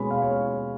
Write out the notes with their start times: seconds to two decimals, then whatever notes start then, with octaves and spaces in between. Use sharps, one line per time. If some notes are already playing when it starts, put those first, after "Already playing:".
Already playing: B2 G#3 C#4 B5
0.11 F5
0.22 C#5